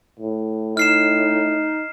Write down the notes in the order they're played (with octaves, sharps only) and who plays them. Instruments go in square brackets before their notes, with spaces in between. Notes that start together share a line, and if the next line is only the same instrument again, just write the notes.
[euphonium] A2
[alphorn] D#4 [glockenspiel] F6 C7 E7